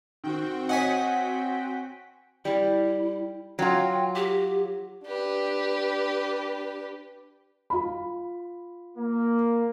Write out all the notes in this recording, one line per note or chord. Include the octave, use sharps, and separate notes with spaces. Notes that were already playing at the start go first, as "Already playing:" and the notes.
D#3 C4 F#4 G5
C#5 D#5 F#5 G#5 B6
G3 E4
F#3 F4 G5
G4
D4 G4 B4
F4 B5
A#3